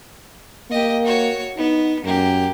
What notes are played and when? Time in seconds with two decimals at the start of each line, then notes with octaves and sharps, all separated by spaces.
0.71 A#3 G4 D#5
1.05 F#4 C#5
1.57 B3 D#4
2.04 F#2 A#3 G4